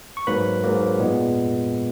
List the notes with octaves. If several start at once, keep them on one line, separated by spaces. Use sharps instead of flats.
C#6
G#2 F#3 A#3 B4 B5
G#2 F#3 A#3
A#2 G#3 B3